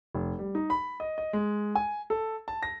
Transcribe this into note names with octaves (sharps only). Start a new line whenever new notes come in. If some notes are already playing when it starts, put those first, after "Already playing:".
F1
G3
D#4
B5
D#5
D#5
G#3
G#5
A4
A5
A#6